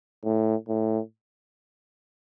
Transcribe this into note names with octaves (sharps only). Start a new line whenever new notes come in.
A2
A2